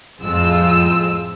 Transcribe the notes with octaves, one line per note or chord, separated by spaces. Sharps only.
F2 A2 G#3 C4 F4 E6